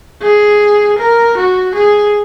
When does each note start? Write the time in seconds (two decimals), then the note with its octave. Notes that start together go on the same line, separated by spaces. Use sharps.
0.22 G#4
0.98 A#4
1.37 F#4
1.75 G#4